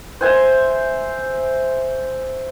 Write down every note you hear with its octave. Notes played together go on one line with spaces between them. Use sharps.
C5 E5 G#5